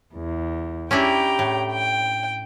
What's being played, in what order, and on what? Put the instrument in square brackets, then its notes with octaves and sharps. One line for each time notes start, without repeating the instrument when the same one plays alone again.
[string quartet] E2
[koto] C#4 D4 E4 [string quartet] G4 G5 A#5
[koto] A2
[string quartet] G5